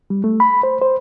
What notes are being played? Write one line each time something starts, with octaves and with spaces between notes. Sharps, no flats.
G3
A3
B5
C5
C5